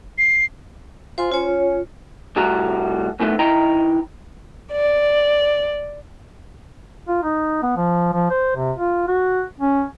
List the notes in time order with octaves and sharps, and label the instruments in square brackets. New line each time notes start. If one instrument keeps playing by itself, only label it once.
[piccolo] C7
[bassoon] F4 [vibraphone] C5 G#5 C6
[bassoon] C#4 [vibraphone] F4 C#5
[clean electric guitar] C2 A2 G3 A3 F#4 A#5
F#2 A2 D#3 A3 B3
D#3 E4 D#5 G5 A#5
[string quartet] D5
[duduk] F4
D#4
B3
F3
F3
C5
C3
F4
F#4
C#4